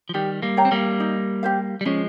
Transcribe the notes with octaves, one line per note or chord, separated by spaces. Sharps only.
F3
D#3 G3 G4
G3 A#3
C#5 G5 A#5
C4
G3 A#3
D#4
G4 C5 F5
G3
F3 G#3 C#4